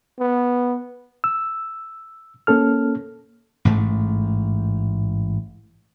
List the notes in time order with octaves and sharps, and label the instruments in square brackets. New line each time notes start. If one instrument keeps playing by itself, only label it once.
[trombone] B3
[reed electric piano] E6
A#3 C#4 A4 F6
[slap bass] A1 G#2 A3